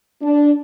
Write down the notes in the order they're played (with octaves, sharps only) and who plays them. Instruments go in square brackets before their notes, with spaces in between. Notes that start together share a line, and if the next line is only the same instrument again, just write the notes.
[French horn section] D4